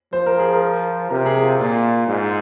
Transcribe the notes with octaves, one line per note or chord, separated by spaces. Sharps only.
F3 C5
A#4
G#4
A#4
C3 A#4
G#4
F4
A#2 F4
G#2